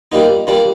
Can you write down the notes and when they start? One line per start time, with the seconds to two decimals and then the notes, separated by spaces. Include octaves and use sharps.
0.12 A#2 G3 A#3 D#4
0.47 A#2 G3 A#3 D4